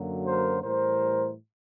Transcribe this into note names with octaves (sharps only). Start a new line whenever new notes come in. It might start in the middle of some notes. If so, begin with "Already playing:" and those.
Already playing: F#2 D3 F#3 A#3
A#4 C5
A2 E3 G3 A#4 C5